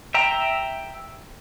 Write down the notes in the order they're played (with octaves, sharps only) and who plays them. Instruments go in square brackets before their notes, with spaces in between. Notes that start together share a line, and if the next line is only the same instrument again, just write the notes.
[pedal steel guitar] E5 G5 A#5